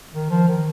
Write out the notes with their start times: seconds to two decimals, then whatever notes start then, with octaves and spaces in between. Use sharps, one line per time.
0.13 D#3
0.30 F3
0.48 D#3